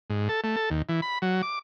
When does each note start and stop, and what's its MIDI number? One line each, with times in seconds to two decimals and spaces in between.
0.10 0.29 44
0.29 0.41 69
0.44 0.56 57
0.56 0.70 69
0.70 0.82 39
0.89 1.01 52
1.02 1.18 83
1.22 1.42 54
1.42 1.59 86